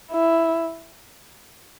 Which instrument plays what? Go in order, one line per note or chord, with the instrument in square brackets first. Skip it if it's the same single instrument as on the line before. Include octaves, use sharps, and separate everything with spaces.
[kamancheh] E4